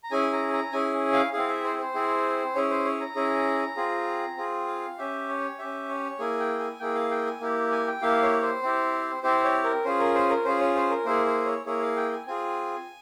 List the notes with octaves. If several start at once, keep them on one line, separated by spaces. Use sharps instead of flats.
A#5
C#4 E4 G#4 G#5
A#5
A#5
C#4 E4 G#4 G#5
F5
C4 E4 G#4 F5
E5
C5
C5
C4 E4 G#4
C#4 E4 G#4 C#5
C5
C#5
A#5
C#4 E4 G#4
C4 F4 G#4
C4 F4 G#4
F5
C#4 G4 E5
C#5
C#4 G4 E5
C#5
A#3 E4 G#4 G#5
G5
G#5
A#3 E4 G#4 G5
F5
G5
G#5
A#3 E4 G4
G#5
G5
A#3 E4 G4 F5
C#5
C5
C4 E4 G4
C4 E4 G4 C5
C#5
A#4
C#4 F4 G#4 C5
A#4
C5
A#4
C#4 F4 G#4 C5
C#5
C5
A#4
A#3 E4 G#4 C5
C5
C#5
A#3 E4 G#4 C#5
F5
G5
G#5
C4 F4 G#4 G#5